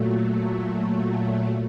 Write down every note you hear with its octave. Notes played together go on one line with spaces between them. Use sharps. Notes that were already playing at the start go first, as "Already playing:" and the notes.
Already playing: A#2 F#3 A3